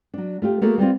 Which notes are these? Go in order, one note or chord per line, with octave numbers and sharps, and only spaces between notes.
F#3 D4
A3 F4 G4
A3 A#3 F#4 G#4 A4
G3 B3 C4 F4